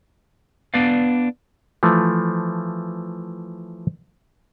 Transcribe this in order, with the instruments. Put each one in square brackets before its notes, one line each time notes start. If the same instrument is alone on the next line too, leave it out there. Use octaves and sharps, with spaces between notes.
[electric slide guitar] B3 D4 B4 D5 F5
[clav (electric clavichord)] E3 F3 A3